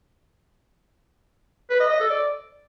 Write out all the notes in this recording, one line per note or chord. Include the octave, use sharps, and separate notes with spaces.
B4
D#5
D#5
A4
D5